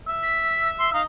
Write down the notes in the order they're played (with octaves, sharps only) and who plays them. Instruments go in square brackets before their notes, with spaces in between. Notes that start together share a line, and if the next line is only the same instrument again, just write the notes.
[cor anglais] E5
[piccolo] B6
C6
[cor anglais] D#4 [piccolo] F5